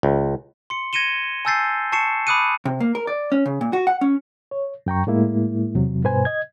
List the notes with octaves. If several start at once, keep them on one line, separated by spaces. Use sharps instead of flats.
C#2
C6 C#7
G#6 A#6 C#7 D#7 E7 G7
G#5 A5 E6 G6 A6 C7
A5 C#6 C7 C#7 E7
B5 D6 D#6 F#6 C#7 D#7
C3
A#3
A#4
D5
C#4
C#3
A#2
F#4
F#5
C#4
C#5
F#2 G5 A#5 C#6
A2 G#3 A#3 E4
E2 C3 F#3
G2 B2 B4 C5 G#5
D#5 G#6